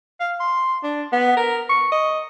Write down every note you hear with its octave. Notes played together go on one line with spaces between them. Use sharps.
F5
C6
D4
B3
A#4
C#6
D#5